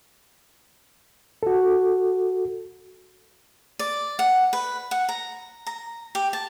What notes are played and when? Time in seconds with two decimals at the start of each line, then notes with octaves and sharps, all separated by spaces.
1.43 F#4 A4
3.79 D5
4.19 F#5
4.53 B4
4.91 F#5
5.09 A#5
5.67 A#5
6.15 G4
6.33 A5